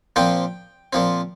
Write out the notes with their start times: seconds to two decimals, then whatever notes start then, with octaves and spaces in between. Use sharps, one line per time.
0.16 A#2 F3 C4 G5
0.93 A#2 F3 C4